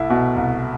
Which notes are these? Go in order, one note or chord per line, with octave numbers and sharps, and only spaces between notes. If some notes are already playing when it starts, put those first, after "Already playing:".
Already playing: C2 A3 E4
B2
C2